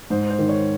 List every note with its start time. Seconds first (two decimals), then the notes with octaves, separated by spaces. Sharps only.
0.10 G#2 C5
0.30 C5
0.39 D#3
0.49 C#5